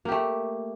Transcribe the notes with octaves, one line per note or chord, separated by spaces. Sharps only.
A3 A#3 G4